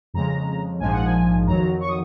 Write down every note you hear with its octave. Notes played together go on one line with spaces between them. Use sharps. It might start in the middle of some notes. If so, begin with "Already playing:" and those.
F2 C#3 G#3 A#5
A#1 G#2 F3 G#3 G#5
F#5
G#5
F2 D#3 F#3 A#5
C#6
D#6